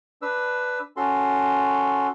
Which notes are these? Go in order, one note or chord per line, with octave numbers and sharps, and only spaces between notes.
D4 B4 E6
C#4 F#4 A4 C6